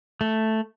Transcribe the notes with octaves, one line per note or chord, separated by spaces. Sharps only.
A3